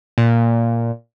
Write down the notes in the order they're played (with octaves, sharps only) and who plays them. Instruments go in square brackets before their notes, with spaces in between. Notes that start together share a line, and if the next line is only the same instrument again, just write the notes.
[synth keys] A#2